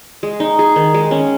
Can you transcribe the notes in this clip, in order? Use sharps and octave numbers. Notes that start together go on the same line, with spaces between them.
G#3
D#4
G#4
D#3
G#3
C#4